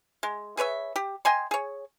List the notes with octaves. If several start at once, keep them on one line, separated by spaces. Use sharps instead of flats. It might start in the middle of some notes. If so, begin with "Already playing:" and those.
G#3
G#4 B4 C#5 E5
G4
D#5 G5 G#5 C6
G#4 C#5